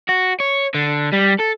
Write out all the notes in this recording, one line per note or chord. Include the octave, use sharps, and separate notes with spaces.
F#4
C#5
D3
G3
A4